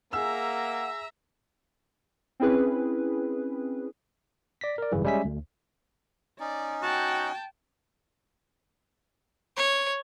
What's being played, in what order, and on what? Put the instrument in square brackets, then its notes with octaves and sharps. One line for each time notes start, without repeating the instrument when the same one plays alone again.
[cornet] A#3 [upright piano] G#4 E6 [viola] E5 A#5 [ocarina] F#5
[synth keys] C4 C#4 E4 G#4 B4
[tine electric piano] D5 A#6 B6
A#4 D5
G#1 F#2 C#3 E3 G3
G3 G#3 C#4 E5 G#5 B6
D2
[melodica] C#4 D#4 [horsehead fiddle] D5
[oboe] F#4 [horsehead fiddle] G5 A5
[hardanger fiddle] C#5